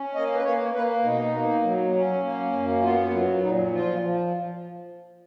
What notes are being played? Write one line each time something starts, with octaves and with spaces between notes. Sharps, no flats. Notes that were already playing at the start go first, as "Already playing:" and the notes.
Already playing: C#4
A#3 D#5
B4
A#3 C#5
A#3 B4
B2 D#4
A#3
F#3
C#4
A#3
F#2
B3 F4
F#3 F4
A#2 D#4
F3 F4
F3